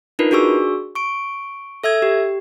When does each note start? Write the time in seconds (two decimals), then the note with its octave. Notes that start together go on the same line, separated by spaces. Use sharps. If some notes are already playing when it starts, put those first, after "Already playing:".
0.19 D4 D#4 F4 A#4 B4
0.31 D4 F#4 G#4 C#6 E6
0.95 C#6 D7
1.84 A4 E5 E6 G#6
2.02 G4